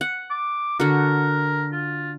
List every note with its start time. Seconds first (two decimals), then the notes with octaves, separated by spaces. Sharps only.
0.01 F#5
0.31 D6
0.80 D3 F#4 A#4
1.72 F4